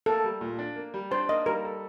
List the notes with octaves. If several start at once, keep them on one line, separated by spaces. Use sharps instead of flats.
A#3 A4
G3
A#2
D4
A#3
G3
D4 C5
A#3 D#5
G3 A#4
A4